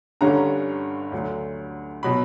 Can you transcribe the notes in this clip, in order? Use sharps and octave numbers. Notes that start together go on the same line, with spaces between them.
G1 G2 D3 G3 C#4 A#5
D2 D3 F#3
B2 F#3 B5